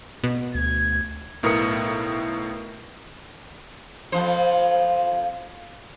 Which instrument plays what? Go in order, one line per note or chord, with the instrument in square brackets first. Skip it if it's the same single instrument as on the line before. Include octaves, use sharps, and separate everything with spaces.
[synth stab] B2
[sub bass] D2 [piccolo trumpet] G#6
[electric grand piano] B1 A2 A#4 B4 D#6 C#7
[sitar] F2 F3 C5